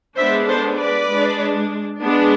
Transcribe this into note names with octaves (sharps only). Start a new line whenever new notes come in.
G#3 B3 D4 C5 E5
A4 C5
B4 D5
G#3 D4
G#3 B3 D4